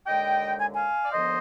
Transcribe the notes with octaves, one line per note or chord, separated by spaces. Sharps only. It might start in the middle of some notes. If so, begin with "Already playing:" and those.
D#2 D3 G#3 D#5 G5
G#5
F5 G#5
D5
D#2 D3 F3 B3 C5 D#5